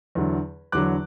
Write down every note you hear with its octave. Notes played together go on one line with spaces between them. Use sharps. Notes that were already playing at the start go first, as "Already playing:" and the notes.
E2 D3 F#3
E2 D3 F#3 D6 F#6